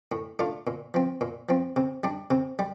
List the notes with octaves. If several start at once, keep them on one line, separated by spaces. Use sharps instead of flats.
A2
A3 D4 F4
A#2
F3 C4
A#2
F3 C4
C3
G3 D4
C3
G3